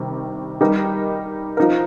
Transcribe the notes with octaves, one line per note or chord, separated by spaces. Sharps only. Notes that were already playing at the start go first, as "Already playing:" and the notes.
Already playing: C3 D#3 G3
G3 D#4 G4 A#4
F3 D#4 A#4